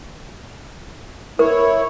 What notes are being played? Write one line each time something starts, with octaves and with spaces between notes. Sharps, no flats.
E4 A#4 C#5